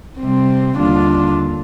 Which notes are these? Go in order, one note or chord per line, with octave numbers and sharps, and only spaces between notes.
C3 G3 C4
D#2 D3 G3 D4 F4